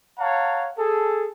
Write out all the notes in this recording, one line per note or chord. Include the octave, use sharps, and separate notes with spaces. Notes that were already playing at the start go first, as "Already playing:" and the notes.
C#5 F5 F#5 A5 A#5
G#4 A4